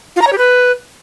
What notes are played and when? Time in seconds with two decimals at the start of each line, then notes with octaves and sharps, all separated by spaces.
0.16 F4
0.22 A#5
0.27 C#5
0.32 G4
0.38 B4